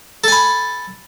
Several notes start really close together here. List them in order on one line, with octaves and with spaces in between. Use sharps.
A4 G#5 B5